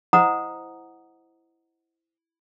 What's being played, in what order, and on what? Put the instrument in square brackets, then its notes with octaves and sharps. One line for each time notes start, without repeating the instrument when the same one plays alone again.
[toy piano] E4 C5 D#5 F#5 A#5 D#6